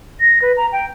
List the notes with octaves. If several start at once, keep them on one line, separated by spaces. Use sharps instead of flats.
A#6
B4
A#5
G5